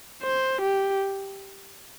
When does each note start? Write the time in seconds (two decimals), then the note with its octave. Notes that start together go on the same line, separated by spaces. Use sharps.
0.23 C5
0.61 G4